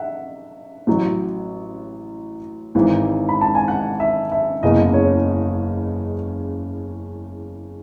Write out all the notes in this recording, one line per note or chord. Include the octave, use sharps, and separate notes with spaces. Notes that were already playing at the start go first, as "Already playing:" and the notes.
Already playing: E5 F#5
A1 A2 F#3
G#1 G#2 E3
B5
A5
G#5
F#5
E5
E5
F#1 E2 C#3 D#5
C#5